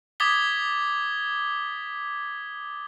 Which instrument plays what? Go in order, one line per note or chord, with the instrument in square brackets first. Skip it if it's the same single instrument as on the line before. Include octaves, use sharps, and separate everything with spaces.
[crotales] D6 D#6 G#6 A6 B6 G7